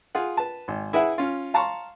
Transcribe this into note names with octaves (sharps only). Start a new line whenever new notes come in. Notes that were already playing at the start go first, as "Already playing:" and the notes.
F4 G#4 F#5
B4 A5
G#1
E4 G#4 B4 E5 F#5
C#4 F4
F5 A5 A#5 C6 C#6